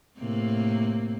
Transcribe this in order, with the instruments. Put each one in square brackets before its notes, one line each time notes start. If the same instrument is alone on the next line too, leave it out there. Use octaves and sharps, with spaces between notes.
[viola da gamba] A2 C3 A#3